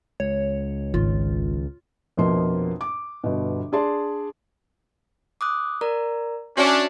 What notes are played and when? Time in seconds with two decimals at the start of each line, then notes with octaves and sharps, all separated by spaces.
0.20 C#2 C#5
0.94 G#1 D#3 F4
2.17 A#1 F2 B2 A#3 C6
2.81 D6
3.24 G1 B2
3.72 D4 G#4 D5 A5 C6
5.41 D6 D#6 F#6
5.81 A#4 D5 A#5
6.57 C#4 D4 F#4 E5